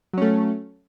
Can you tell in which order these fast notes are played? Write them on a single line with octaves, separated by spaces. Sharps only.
F#3 C#4 A3